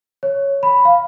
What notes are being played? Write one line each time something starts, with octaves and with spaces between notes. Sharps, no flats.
C#5
B5
F5